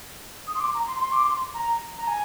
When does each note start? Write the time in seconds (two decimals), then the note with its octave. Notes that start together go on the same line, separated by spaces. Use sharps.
0.47 D#6
0.55 C6
0.60 D6
0.74 A#5
0.87 C6
1.01 C6
1.12 D6
1.23 C6
1.54 A#5
1.97 A#5
2.07 G#5